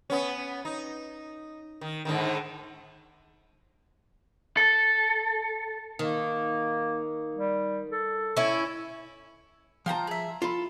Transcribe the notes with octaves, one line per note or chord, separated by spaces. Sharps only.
B3 C#4
D#4
D#3
G#2 D3 D#3
A4
D#3 A#3
G3
A4
C#4 E4
F3 F4 G5 A5 A#5
G#4 E5
F4 A4 B5